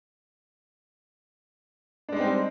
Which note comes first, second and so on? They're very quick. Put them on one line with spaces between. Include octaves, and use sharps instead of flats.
D4 G#3 D#4 C4 G3